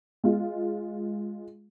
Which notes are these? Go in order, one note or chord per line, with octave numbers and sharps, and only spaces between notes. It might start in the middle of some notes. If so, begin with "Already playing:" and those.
G#3 F4